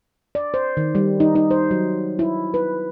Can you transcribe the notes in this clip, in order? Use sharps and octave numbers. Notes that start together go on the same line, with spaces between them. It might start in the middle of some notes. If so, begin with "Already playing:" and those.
D5
C5
D#3
G3
D#4
D#4
C5
F#3
E4
B4